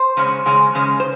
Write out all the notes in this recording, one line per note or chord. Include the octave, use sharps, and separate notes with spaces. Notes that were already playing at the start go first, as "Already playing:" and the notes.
Already playing: C5
C#3 G#3 C#4
C#3 G#3 C#4
C#3 G#3 C#4
C5